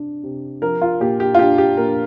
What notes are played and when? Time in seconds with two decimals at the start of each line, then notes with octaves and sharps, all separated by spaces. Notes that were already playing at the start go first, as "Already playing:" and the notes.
Already playing: C3 D4
0.23 C3
0.62 F3 A#4
0.82 F4
1.00 A#2 G4
1.20 G4
1.35 F4
1.39 D4 G4
1.58 G4
1.77 A#2 A#4